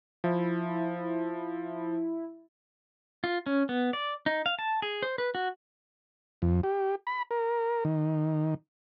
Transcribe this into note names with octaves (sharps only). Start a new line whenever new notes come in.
F3 E4
F4
C#4
B3
D5
D#4
F5
A5
G#4
C5
B4
F#4
F2
G4
B5
A#4
D#3